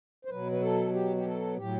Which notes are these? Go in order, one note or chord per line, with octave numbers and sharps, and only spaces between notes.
C5
B2 F#3 B4
B4
A4
G4
G4
A4
A2 F#3 G4